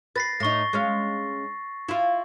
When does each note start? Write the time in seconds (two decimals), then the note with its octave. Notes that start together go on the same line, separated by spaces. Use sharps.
0.16 B4 A6 A#6 C7
0.40 A2 D#4 C#6 A#6
0.73 G#3 C#4 F5
1.88 E4 F4